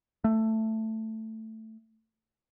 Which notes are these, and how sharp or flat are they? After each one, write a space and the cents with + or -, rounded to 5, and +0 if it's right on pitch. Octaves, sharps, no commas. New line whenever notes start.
A3 +10